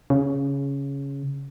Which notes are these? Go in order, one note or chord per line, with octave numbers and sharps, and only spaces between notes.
C#3